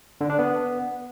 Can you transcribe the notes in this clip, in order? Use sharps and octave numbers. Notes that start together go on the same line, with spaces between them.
D3
D4
B3